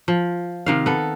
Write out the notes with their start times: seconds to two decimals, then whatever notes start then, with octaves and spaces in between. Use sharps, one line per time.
0.08 F3
0.66 C3 D#3 F5
0.86 B3 A4